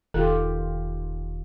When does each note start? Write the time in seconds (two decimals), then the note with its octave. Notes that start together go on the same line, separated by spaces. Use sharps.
0.14 E1 D#3 F4 G4 A4